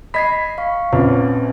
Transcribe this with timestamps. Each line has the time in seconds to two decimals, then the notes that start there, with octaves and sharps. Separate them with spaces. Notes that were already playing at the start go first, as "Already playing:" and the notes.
0.14 D#5 B5 G#6 B6 C7
0.58 F5 C#6
0.93 A#1 C4 C#4 B4